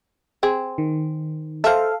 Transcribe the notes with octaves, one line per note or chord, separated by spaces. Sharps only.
C4 G#4
D#3
A4 C5 E5 F5